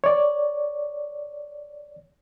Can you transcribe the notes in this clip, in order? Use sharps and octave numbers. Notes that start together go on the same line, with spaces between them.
C#5 D5